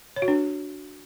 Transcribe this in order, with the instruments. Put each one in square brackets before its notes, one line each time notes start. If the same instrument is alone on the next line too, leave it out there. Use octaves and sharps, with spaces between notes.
[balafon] C#5
F#4
D4